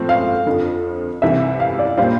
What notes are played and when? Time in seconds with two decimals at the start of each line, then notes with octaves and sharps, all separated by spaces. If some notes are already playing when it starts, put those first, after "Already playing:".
Already playing: A2 F3 A3 C4
0.09 F5
0.46 F2 D3 F3
1.22 C2 C3 E3 E5
1.60 F5
1.79 D5
1.98 A#2 G3 D4 G4 C5 F5